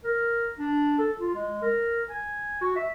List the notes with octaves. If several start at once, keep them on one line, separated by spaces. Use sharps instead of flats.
A#4
D4
A4
F4
G#3
A#4
G#5
F#4
E5